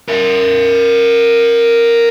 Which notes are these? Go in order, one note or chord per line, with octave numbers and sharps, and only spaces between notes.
A#4 E5